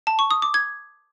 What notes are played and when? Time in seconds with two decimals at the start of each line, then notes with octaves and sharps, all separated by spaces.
0.07 A5
0.19 C#6
0.31 D#6
0.42 D6
0.54 G#6